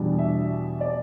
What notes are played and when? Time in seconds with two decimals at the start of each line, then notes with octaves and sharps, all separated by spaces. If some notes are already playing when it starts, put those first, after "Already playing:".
Already playing: E2 B2 G3 D4
0.18 E5
0.81 D5